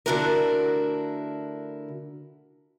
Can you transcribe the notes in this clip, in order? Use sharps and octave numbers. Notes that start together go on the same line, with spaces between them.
D3 A3 D4 E4 F#4 A#4